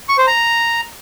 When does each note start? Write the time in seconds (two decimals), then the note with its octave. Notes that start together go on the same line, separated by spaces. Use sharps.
0.09 C#6
0.18 C5
0.27 A#5